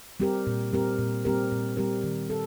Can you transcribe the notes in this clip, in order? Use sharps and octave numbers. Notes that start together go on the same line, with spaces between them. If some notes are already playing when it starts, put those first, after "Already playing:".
G3 C4 G4 A#4
A#2
G3 C4 G4 A#4
A#2
G3 C4 G4 A#4
A#2
G3 C4 G4 A#4
D#3
A4